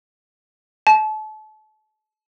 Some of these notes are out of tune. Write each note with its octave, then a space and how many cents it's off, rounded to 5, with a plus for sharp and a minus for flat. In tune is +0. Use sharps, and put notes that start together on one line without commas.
A5 -35